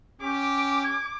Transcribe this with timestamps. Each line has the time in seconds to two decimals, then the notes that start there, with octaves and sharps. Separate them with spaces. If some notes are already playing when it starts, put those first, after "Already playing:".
0.21 C#4 G4 D6
0.84 G#6